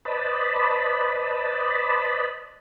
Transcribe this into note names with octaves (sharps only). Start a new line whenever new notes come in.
B4 C5 D5 D#5 A5 B5